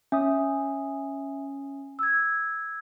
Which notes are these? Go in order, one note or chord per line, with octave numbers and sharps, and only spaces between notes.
C#4 E5 D#6
E6 G#6